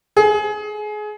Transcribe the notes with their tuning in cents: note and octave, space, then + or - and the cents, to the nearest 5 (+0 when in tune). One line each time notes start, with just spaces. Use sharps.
G#4 +25